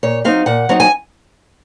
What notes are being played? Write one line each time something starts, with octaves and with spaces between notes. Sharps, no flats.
A#2 C#5
F#3 C4 D#4 F5
A#2 F#5
F#3 C4 D#4
G#5